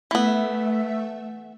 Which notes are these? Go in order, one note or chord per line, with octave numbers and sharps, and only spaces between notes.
E3 A3 B3 E5